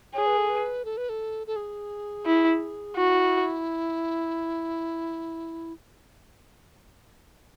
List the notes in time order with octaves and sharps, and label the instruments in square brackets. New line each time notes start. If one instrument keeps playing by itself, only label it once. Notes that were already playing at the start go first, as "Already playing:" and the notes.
[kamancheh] G#4 [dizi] C#5
[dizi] B4
A4
B4
A4
B4
A4
A4
G#4
[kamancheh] E4
[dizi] E4 [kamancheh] F#4